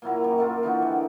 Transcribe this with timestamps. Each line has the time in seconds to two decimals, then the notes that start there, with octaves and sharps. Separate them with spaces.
0.02 A#2 F#3 E4 A#5
0.24 F#2 G3
0.38 A3 A#3 F4
0.63 D3 E3 D#4 F#4
0.82 G3